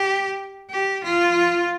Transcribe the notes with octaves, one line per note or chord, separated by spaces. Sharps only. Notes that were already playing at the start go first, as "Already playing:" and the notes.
Already playing: G4
G4
F4